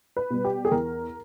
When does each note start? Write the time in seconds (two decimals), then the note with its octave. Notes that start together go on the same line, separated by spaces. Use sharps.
0.17 B4
0.30 B2 G3
0.44 G4
0.65 G#4
0.71 E2 A#4